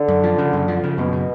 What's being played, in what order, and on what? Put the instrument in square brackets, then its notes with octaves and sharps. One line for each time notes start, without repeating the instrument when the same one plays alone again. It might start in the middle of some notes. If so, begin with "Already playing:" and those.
Already playing: [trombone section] D3
[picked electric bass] F#2
F3
C#3
F#2
F3
C#3
[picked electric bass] F#2 [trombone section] B2
[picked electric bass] C#3